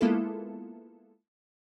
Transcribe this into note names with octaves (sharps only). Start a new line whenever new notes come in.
G#3 A#3 B3 E4 F4 A4